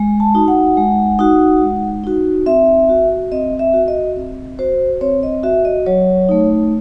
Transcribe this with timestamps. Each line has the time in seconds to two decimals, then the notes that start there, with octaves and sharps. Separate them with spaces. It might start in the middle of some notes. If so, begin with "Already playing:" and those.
Already playing: G#3
0.20 A5
0.35 D#4 F#4
0.48 F#5
0.77 G#3
1.19 D#4 F#4
1.62 G#3
2.04 D#4 F#4
2.46 C4 E5
2.89 F#4
3.32 C4 D#5
3.59 E5
3.74 F#4
3.88 D#5
4.16 C4
4.59 F#4 C5
5.01 C4 C#5
5.23 D#5
5.43 F#4 E5
5.65 D#5
5.86 F#3 C#5
6.29 A3 D#4